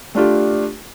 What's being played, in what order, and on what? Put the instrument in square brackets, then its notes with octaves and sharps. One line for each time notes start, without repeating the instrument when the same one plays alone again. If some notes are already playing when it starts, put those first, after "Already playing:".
[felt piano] A3 D4 F4 G4